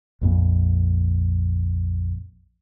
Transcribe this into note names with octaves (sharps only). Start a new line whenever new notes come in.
A#1 F2 A#2